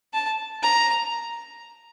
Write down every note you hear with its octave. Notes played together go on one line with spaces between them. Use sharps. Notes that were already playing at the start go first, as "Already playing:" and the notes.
A5
A#5